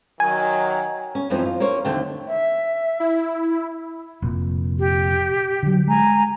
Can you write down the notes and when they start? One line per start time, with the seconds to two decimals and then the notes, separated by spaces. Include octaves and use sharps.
0.20 D#3 F#3 G#5
1.15 C#4
1.30 F#2 E3 F3 C4 D#4
1.45 F4
1.60 A#3 C#4 C5 C#5
1.85 D#2 D3 F#3 A3 C4 G5
2.27 E5
3.00 E4
4.22 F1 A#2
4.79 G4
5.63 D3 F#3
5.87 G#3 G#5 A#5